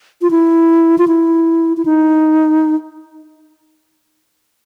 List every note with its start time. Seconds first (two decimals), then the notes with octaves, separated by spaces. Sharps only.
0.22 F4
0.31 E4
0.98 F4
1.07 E4
1.77 E4
1.85 D#4